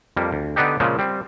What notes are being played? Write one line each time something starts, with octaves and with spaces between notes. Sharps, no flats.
F2 G3 A#3
D2
D3 B3 D4 D#4 G4
A#2 C#3 F3 G#3
G3 C4